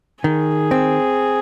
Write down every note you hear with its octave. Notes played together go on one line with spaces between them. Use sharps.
D#3 G#4
C4